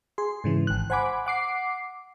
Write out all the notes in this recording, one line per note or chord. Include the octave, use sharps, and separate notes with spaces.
G#4 C6
G#2 C#3 E3
G#1 F#6
C5 F#5 G#5 B5 D6
F#5 D6 C7